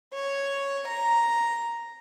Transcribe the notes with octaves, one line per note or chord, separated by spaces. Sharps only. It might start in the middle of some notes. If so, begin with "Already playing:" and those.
C#5
A#5